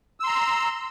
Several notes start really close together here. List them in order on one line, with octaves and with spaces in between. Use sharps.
E6 C6 A#5